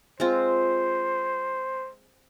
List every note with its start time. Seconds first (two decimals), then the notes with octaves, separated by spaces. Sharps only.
0.20 G#3 C4 F4 C5